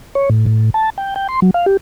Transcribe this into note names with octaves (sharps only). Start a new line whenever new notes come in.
C#5
A2
A2
A5
G5
G5
C6
F#3
F5
G4